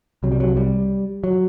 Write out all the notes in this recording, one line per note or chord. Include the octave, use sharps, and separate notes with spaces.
C2 C3 F#3
G3
F#3
G3
F#3